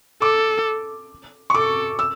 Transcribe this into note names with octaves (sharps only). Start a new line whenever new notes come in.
A4 D6
C#6
A4 D6
E6